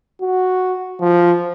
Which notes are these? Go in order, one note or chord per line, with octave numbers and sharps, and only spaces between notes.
F#4
F3